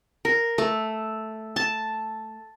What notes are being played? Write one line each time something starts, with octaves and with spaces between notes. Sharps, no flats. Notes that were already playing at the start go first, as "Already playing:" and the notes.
A#4
A3
A5